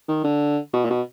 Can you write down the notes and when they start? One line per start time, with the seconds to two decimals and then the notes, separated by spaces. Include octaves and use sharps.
0.08 D#3
0.24 D3
0.73 B2
0.85 A#2
0.90 B2